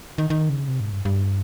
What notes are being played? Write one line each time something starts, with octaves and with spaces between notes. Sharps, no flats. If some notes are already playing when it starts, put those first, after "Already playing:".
D#3
D#3
C#3
C3
G#2
G2
G2